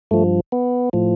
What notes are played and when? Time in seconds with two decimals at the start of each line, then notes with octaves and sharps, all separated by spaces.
0.11 G2 F3 A3
0.52 B3
0.93 A2 F3